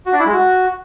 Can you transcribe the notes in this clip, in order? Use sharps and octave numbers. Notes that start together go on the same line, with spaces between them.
F#4
D4
E4
G#3
F#4